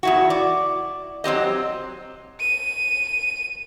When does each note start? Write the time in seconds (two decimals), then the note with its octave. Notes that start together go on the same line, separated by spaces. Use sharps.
0.03 E2 E4 F#4
0.30 D5
1.24 F#3 C4 G4 D#5
2.40 D#7